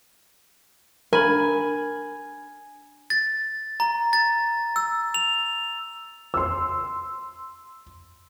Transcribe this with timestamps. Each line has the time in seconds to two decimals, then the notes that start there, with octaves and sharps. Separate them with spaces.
1.13 D4 A#4 G#5 B5 F#7
3.10 A6
3.80 A#5
4.13 A6
4.76 E6
5.14 F7
6.34 C6 E6